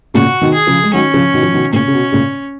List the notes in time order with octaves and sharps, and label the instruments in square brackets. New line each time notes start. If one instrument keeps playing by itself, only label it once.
[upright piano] A#2 C#3 [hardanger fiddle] F#4
[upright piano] B2 D#3
[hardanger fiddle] G#4
[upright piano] C#3 F3
G#3
[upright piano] D#3 F#3 [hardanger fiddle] C#4
[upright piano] C#3 F3
B2 D#3
F3
B2 D#3
[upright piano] A#2 C#3 [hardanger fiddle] C#4
[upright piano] C#3
B2
A#2 C#3